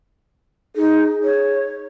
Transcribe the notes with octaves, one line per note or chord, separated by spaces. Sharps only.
D#4 G#4
C#5